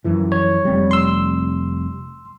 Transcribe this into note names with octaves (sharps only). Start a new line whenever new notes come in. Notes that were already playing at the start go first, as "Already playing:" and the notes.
F#2 E3 F3
C#5
F1 C3 G3
C6 E6